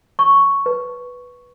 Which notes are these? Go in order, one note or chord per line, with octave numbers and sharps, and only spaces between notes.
C#6
B4